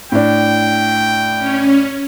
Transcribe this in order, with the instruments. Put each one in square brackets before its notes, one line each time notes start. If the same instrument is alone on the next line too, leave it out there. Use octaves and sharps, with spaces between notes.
[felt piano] A2 D4 [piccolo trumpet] G5
[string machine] C#4